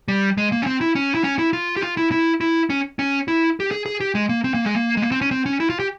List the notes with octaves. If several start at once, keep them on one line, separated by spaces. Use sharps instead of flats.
G3
G#3
A#3
C#4
C4
E4
C#4
E4
C#4
E4
F4
G4
F4
E4
E4
E4
C#4
C#4
E4
G4
G#4
G#4
G4
G#3
A#3
C4
A#3
G#3
A#3
G#3
A#3
C4
C#4
C4
C#4
E4
F4
G4